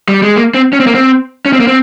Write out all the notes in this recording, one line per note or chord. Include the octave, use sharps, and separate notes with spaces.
G3
G#3
A#3
C4
C#4
C4
A#3
C4
C#4
C4
A#3
C4